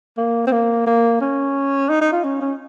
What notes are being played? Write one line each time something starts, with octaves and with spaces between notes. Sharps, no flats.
A#3
C4
A#3
A#3
C#4
D#4
D#4
F4
C#4
C#4